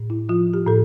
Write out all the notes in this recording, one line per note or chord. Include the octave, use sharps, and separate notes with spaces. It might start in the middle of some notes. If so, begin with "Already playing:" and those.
Already playing: A2
E4
F3 F4
G4
A2 A4